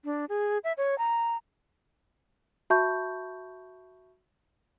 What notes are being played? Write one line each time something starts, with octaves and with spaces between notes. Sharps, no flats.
D4
G#4
E5
C#5
A#5
F#4 E5 A5 B5 C#6 G6